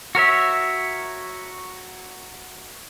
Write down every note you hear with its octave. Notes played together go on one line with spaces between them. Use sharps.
F#4 A#4 C#5 E5